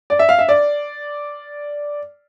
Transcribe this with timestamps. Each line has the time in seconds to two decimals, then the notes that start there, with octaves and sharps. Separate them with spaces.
0.10 D5
0.19 E5
0.29 F5
0.39 E5
0.49 D5